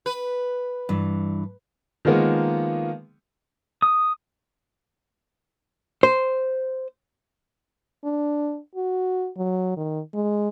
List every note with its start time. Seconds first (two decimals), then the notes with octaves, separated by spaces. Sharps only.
0.06 B4
0.89 G2 E3
2.05 D#3 F3 G#3 A#3 B3
3.82 D#6
6.03 C5
8.04 D4
8.75 F#4
9.37 F#3
9.77 D#3
10.14 G#3